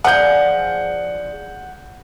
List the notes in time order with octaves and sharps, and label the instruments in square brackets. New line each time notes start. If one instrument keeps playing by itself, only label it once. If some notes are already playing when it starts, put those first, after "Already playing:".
[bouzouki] F3 D4 G#4 [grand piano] F#5 G6